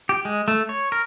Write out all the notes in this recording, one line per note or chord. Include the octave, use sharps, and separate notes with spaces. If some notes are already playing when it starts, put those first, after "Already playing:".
G4
G#3
A3
C#5
A#4